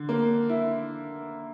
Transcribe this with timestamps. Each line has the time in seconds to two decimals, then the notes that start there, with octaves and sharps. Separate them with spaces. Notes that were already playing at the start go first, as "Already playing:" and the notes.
Already playing: D3
0.09 A#3
0.49 E4